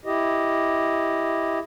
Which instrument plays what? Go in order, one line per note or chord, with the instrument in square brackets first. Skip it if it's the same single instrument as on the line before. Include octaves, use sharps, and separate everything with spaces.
[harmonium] E4 G4 D#5